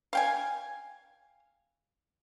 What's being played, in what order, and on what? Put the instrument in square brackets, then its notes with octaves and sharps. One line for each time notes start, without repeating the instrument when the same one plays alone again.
[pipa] F5 G5 G#5